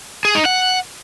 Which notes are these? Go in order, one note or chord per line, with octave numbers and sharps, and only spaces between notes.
G#4
D#4
F#5